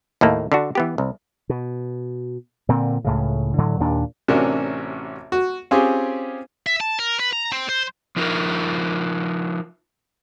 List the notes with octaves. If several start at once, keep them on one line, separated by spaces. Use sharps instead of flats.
D#2 A2 A3 A#3
D3 D4 F#4
E3 B3 G4
C2
B2
A#2 D3 C4
C#2 A2 C#3
A2 D3 F#3
D#2 A#2 D4
A1 C3 C#4 D4 F#4 A#4
F#4
C4 C#4 F4 G4 G#4
E5
A5
A#4
B4
A#5
C4
C5
F3 D#4 F4 A#4 E5